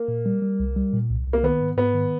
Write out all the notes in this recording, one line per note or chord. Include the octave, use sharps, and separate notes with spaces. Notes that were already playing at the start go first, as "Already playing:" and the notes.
Already playing: A#3
A#2
G3
G3
C2
G3
A#2
C2
C2
A#3
D#3 B3
G#2
G#2 B3
D#3